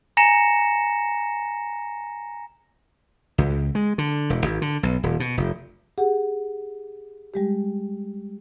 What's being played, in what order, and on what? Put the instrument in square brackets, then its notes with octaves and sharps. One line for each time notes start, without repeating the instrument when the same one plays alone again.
[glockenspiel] G#5 A#5 A#6 C#7 E7
[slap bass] C#2
G#3
D3
E1
G#1
D3
B1
D#1
B2
F1
[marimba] G4 G#4 F#5
G3 G#3 G4